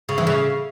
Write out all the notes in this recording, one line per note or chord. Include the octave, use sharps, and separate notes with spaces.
C#3
E3
C#3